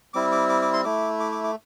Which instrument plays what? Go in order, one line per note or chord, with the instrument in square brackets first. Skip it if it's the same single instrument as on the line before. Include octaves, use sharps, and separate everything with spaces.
[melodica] G3 C4 E4 D6
D6
D6
D6
C6
A3 E4 D6
D6
D6
D6